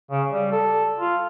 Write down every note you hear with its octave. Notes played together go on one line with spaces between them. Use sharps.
C#3
G3
A4
F4